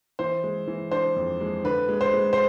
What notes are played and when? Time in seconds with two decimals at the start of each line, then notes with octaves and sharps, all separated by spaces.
0.19 E3 C5
0.44 G#3
0.67 E3
0.92 D4 C5
1.16 F2
1.41 G#3
1.64 D3 B4
1.89 G#3
2.01 C5
2.14 G#3
2.33 C5